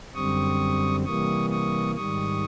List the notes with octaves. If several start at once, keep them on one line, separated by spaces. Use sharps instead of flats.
F#2 D3 G3 C4 C#6 D#6
C3 E3 G3 A#3 C#6 D#6
C#6 D#6
G#2 D#3 G3 C#6 D#6